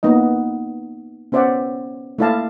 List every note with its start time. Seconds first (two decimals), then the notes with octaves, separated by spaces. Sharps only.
0.03 A#3 B3 D#4 D#5
1.32 B3 C#4 C5 D5 E5 F#5
2.19 A3 A#3 E4 D5 F5 A5